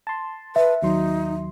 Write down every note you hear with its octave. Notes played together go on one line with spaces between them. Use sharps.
A5 C6
B4 E5
D#2 F#3 D#4 C6